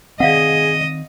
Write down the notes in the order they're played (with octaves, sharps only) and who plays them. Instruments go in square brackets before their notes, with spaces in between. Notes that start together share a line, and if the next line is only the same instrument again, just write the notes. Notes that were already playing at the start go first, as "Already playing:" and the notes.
[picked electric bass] D#3 C4 [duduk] G#4 [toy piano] D5 F5 F#5 [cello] D#5